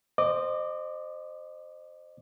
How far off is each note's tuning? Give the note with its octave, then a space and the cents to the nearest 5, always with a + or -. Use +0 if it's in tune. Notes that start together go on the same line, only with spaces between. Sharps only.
C5 +0 D#5 -30 D6 +0